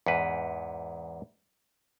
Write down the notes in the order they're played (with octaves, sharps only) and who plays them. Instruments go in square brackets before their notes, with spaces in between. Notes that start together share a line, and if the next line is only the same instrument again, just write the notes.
[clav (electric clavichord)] E2 G#2 B4